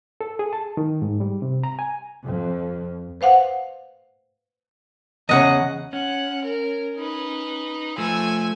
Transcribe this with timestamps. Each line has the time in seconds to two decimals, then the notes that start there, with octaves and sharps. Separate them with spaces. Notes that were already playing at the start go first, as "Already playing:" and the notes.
0.21 A4
0.39 G#4
0.53 A5
0.77 D#3
1.02 G#2
1.20 G3
1.42 C3
1.63 A#5
1.79 G#5
2.25 F2
3.21 B4 C5 F5 F#5
5.29 E2 A2 C#3 D#5 F#5
5.93 C#4 F#5
6.45 A#4
6.97 D#4 B4
7.98 F3 A3 G#5 E6